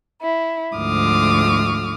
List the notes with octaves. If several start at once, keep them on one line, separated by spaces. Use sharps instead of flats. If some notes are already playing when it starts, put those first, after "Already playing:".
E4
D2 G#2 F3 D6 D#6 F6